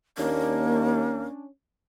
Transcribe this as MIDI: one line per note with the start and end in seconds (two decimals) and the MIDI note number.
0.18 1.27 39
0.18 1.25 58
0.18 1.46 61
0.18 1.46 62